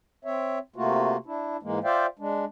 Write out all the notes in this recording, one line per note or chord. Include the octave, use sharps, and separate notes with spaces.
C4 C#5 E5
C3 A3 A#3 F4 F#4
D4 E4
G#2 E3 G#3 A#3
F4 C5 D5 E5 F5 G5
G#3 D4